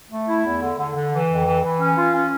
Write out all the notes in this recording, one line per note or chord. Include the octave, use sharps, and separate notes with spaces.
A3
E4
E2
D3
D3
D3
E3
F2
E3
E3
C#4
F4
C#4